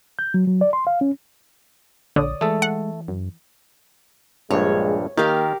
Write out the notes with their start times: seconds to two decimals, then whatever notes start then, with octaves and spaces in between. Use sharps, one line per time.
0.19 G6
0.34 F#3
0.47 F#3
0.61 D5
0.73 C6
0.87 F5
1.01 C#4
2.16 A#1 D3 C#5 D5 D#6
2.41 E3 G#3 A3 A4
2.62 F#5
3.08 F#2
4.51 A#1 G2 G#3 C#5
5.18 D#3 A#3 G4 A#4 F5